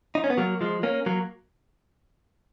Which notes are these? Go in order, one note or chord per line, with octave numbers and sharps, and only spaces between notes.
D#4
C#4
B3
F#3 A#3
F3 G#3
A#3 C#4
F#3 A#3